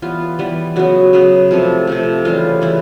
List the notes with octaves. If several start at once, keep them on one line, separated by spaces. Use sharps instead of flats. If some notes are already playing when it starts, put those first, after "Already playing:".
E3 G3 B3 F4
E3 G3 B3
C#3 F#3 B3 F#4
C#3 F#3 B3
C3 F3 A3
C3 F3 A3
C#3 E3 G3 F4
C#3 E3 G3 E4